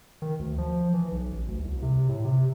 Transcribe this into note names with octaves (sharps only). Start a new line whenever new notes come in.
D#3
D2
F3
E3
B1
A1
D2
C2
C3
A2
C3